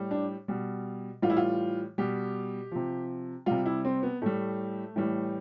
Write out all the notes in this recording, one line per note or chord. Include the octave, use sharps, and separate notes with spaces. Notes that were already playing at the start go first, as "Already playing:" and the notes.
Already playing: A2 G3
D4
B2 G3
A2 E3 G3 F4
E4
F4
B2 G3 G4
C3 F3
C3 G3 F4
E4
C4
B3
A2 G3 A3
A2 E3 G3